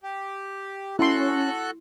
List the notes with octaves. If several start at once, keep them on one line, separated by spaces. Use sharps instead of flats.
G4
C#4 E4 F#4 A4 C6 F#6